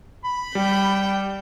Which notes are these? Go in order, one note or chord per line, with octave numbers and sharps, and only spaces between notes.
B5
G3 G5